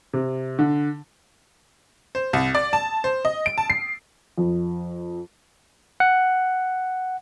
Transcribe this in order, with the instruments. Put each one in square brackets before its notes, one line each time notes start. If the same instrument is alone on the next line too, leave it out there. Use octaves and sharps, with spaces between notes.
[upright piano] C3
D3
[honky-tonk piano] C5
C2
D5
A5
C5
D#5
D7
A5
C7
[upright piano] F2
[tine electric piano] F#5